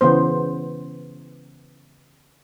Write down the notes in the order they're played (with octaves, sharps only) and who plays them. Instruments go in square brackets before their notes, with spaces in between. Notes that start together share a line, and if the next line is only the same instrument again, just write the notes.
[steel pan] C#3 E3 B3 C5